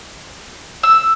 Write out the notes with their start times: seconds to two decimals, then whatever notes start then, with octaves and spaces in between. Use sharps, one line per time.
0.83 E6